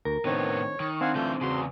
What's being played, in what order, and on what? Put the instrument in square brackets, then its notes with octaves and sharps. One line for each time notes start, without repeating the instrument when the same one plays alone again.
[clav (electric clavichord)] D2 [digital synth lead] A#4
[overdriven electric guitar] A2 B3 [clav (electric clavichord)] D#3 C4 D4 [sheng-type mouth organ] C#5
[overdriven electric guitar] D#3 [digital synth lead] C#6
[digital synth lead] C4 [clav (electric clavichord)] D4 [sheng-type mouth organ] F5 F#5 G#5
[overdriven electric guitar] D3 E3 [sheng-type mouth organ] A3 F4 G6
[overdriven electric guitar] E2 C#3 [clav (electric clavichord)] F#4 G#4 [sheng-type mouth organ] C6